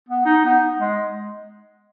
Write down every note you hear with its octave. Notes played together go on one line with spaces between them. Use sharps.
B3
D#4
B3
G#3